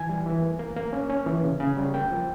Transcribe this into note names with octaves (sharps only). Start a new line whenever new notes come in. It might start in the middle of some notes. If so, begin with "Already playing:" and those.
Already playing: E3 G#5
G3
E3
A#3
A#3
A#3
C#4
C#4
E3
C#3
C#3
G3
A#3 G5
F3